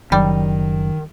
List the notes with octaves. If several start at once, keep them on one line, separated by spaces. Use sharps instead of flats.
F#1 D#3 F#3 G3